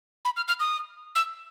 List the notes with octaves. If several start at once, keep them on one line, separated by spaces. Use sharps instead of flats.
B5
F6
F6
D#6
E6